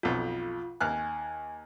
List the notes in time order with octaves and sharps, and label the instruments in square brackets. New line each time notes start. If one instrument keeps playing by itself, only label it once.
[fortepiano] B1 F2 [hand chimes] F4
[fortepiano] D#2 F6 F#6 [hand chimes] G#5